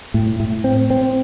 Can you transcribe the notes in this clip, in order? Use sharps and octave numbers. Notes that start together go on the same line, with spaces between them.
A2
A2
C4
C4